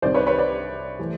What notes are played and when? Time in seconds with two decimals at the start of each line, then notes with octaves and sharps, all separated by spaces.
0.02 C2 C3 D#3 C5 D5
0.14 B4 C#5
0.26 B4 C#5
0.38 C5 D5
0.99 E3 A3